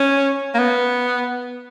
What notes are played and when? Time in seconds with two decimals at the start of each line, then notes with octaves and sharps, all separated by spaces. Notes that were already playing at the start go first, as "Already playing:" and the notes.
Already playing: C#4
0.55 A#3
0.59 B3